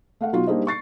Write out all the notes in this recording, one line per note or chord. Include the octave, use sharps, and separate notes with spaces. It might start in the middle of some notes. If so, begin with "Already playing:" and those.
A3 F5 F#5
B2 F#3 D#4 F4 F#4
G3 A#3 D4 D#4 C5 D#5
C#6 A6 C7